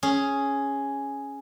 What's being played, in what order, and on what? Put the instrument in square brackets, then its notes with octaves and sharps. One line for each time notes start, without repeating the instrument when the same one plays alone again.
[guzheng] C#4 G#4